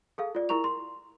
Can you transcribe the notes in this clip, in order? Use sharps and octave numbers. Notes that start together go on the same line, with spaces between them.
G#4 A4 F5
F4 D5
E4 A#4 A#5 C#6 F7
C6